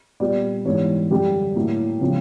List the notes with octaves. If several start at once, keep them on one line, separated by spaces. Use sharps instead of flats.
A#2 G3 B3 D5
G#2 E3 G3 B3 C#5
F#2 D3 G3 G4
A2 F#3 A#3
C#3 F3 G#3 B3